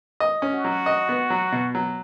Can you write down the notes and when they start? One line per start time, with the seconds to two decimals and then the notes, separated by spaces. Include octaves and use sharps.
0.20 D#5
0.42 C#4
0.53 F#4
0.64 F#3
0.86 D#5
1.09 B3
1.30 F#3
1.52 B2
1.75 F#3